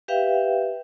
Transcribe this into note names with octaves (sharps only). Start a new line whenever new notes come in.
G4 B4 E5 F5 G5